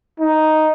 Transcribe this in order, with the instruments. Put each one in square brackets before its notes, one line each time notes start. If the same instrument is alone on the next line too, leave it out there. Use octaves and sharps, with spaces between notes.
[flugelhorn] D#4